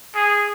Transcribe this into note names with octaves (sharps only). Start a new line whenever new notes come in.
G#4